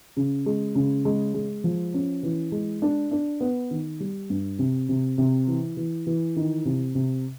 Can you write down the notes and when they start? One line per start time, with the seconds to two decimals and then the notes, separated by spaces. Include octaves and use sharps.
0.17 C#3
0.46 G#3
0.75 C#3
1.05 G#3
1.34 G#3
1.64 F3
1.94 C#4
2.23 E3
2.52 G#3
2.82 D4
3.11 D4
3.41 B3
3.71 D#3
4.00 G3
4.30 G2
4.59 C3
4.89 C3
5.18 C3
5.47 E3
5.77 E3
6.07 E3
6.36 D#3
6.65 C3
6.95 C3